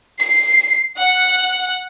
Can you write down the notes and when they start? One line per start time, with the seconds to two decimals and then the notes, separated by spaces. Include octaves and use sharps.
0.20 C7
0.99 F#5